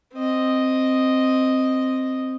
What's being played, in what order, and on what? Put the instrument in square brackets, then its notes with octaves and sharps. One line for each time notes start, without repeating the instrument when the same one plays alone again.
[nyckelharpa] C4 D#5